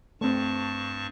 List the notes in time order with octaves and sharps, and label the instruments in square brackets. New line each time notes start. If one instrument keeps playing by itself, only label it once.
[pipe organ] G2 A5 C#6 [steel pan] A3 C4